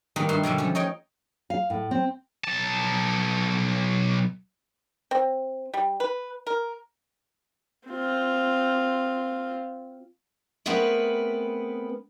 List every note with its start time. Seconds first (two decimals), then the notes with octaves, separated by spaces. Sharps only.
0.16 D#3 G3 A#3 D#4 A#4 B4
0.29 G2 A3 D#4 F#4 C6
0.43 B2 D3 F#3 G3
0.58 F3 C#4
0.75 D#4 C#5 D#5 G5
1.50 F5
1.70 A2
1.91 C4
2.44 B1 A5
5.11 C4
5.74 G3
6.00 B4
6.47 A#4
7.88 C4 F4
10.66 A3 B3 C4 G#4 A#4 B4